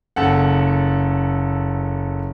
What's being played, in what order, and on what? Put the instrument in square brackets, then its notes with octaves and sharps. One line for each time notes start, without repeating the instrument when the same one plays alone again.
[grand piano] F#1 A4 F#5